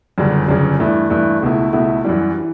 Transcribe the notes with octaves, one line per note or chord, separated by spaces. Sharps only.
G1 F#2 C#3 G3
G1 F#2 C#3 G3
G2 E3 A3
G2 E3 A3
C#2 B2 A3 E4
C#2 B2 A3 E4
F#2 E3 G3
E3